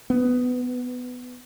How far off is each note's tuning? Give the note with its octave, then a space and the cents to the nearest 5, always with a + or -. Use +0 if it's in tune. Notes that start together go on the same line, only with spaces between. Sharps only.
B3 +15